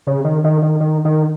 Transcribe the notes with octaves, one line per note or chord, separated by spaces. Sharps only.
C#3
D#3
D#3
D#3
D#3
D#3